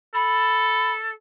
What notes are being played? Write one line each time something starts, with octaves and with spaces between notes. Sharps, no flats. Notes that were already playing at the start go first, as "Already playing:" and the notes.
A4 B5